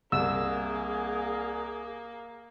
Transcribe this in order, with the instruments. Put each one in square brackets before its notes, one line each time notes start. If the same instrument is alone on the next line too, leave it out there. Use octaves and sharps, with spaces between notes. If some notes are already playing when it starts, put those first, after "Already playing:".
[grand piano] C2 [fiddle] A#3 [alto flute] G#4 [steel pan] E6